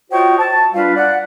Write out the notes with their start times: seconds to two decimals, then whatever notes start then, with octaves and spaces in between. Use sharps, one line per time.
0.11 F4 F#4 C5 C#5 D#5 G5
0.39 A5
0.74 G3 D4 F4 B4 F5
0.95 D5 F#5